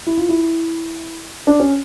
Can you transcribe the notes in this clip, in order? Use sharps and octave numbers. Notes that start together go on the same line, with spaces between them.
E4
F4
E4
D4
C#4